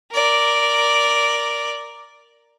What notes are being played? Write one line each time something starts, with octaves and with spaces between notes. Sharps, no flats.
A#4 D5